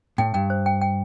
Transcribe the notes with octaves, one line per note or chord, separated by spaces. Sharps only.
A2 G5
G2 G5
C5
G5
G5